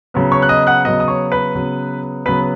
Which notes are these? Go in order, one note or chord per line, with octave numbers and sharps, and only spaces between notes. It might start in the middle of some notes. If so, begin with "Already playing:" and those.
C#3 F#3 B3
C#5 C#6
F#6
D#5 D#6
F#5 F#6
C#3 F#3 B3 D#5 D#6
D#6
C#5 C#6
B4 B5
C#3 F#3 B3
C#3 F#3 B3 B4 B5